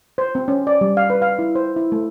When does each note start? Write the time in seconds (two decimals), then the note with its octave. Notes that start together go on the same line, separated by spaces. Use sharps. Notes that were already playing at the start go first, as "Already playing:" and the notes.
0.18 C5
0.35 C4
0.48 C#4
0.67 D5
0.81 G3
0.97 F5
1.10 B4
1.22 F5
1.39 E4
1.55 C5
1.76 E4
1.92 A3